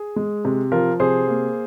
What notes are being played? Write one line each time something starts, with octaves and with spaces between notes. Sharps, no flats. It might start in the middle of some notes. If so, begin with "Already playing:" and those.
Already playing: G#4
G#3
C3
F3 F4 A#4
C3 G#4 C5
A#3